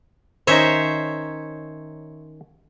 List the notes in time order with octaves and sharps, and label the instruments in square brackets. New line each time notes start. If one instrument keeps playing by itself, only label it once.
[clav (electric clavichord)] D#3 C#4 D#4 [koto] C5 C#5 E5